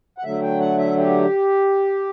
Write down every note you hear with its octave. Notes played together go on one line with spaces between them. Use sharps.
F#5
D3 F#3 A3 E5
G5
F#5
E5
G4